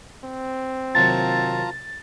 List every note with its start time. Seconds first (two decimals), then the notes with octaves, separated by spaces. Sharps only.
0.24 C4
0.95 D#2 C3 F#3 F4 A5 A#5 A6